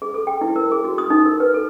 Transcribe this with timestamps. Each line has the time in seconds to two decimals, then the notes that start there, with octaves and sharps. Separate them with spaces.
0.02 G#4
0.14 A4
0.27 G5
0.41 E4
0.56 A#4
0.72 G#4
0.84 F#4
0.98 D#6
1.10 D#4
1.26 A#4
1.40 B4
1.54 A4